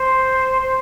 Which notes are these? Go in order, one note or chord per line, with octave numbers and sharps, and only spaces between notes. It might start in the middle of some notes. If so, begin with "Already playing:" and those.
Already playing: C5
C5